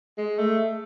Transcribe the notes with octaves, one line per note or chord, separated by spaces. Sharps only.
G#3
A3